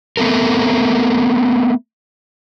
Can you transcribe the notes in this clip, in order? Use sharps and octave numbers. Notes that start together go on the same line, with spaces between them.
A3 B3 C4 A4 A#4